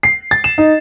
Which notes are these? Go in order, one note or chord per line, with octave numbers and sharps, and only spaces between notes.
C7
A6
E7
D#4